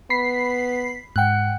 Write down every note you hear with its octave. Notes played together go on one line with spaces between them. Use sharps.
B3 B5 B6 C7
G#2 F#5 G5 F#6